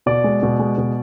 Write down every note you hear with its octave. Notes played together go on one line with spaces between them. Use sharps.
B2 D5
G#3
B2
G#3
B2